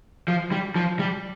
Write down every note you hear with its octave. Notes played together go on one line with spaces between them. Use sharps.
F3
G3
F3
G3